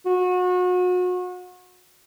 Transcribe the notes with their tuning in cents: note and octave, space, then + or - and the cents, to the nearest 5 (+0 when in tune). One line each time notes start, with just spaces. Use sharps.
F#4 -35